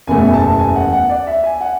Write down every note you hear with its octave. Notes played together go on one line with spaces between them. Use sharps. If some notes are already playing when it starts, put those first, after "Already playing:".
F#1 E2 B2 A3 G#5
A5
G#5
F#5
F#5
D5
E5
G#5
F#5